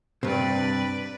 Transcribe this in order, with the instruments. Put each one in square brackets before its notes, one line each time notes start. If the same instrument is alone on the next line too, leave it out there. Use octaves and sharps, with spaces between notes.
[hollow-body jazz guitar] G2 C3 [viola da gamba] B4 D5